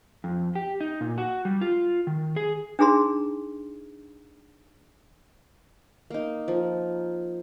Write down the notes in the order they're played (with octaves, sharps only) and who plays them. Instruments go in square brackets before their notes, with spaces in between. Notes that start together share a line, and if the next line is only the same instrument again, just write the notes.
[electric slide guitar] F2
G4
D#4
A#2
F#4
G3
F4
D#3
G#4
[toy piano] D4 D#4 G#4 A#5 C6
[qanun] A#3 D#4
F3